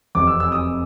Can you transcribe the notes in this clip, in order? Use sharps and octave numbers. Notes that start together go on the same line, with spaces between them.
F1 E2 C3 D6
E6
E6
D#6